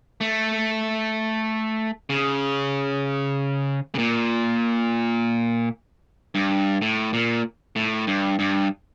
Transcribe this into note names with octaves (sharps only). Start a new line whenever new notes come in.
A3
C#3
C#3
A#2
G2
A2
A#2
A2
G2
G2